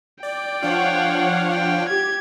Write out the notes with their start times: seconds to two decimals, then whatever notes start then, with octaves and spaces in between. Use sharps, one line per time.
0.23 D5 G5
0.62 F3 D4 F4 C#5 F5 F#5
1.52 G5
1.89 G4 G#6